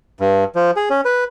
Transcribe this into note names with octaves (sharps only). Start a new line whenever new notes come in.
G2
F3
G#4
C#4
B4